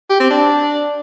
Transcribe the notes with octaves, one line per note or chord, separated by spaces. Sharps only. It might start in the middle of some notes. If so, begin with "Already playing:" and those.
G4
C4
D4